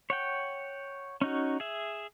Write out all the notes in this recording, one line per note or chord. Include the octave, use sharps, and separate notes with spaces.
C#5 F#5 G5
C#4 D#4 F#4
G#4 E5